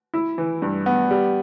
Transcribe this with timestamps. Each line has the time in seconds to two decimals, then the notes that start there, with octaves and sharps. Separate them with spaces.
0.14 E4
0.38 E3
0.62 G2
0.86 B3
1.11 G3